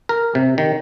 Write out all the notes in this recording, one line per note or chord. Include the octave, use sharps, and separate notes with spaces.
A#4
C3
D#3